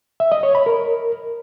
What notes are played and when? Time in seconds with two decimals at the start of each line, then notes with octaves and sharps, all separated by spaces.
0.20 E5
0.32 D#5
0.43 C#5
0.55 B5
0.66 A#4